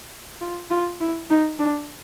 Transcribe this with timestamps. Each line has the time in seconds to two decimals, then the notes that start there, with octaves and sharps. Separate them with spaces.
0.41 F4
0.71 F4
1.01 E4
1.30 D#4
1.59 D4